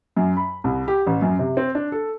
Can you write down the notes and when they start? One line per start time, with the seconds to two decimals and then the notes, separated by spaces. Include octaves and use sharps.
0.16 F#2
0.37 B5
0.64 C2
0.88 G4
1.07 A1
1.22 F#2
1.39 C3
1.57 C4
1.75 D4
1.92 A4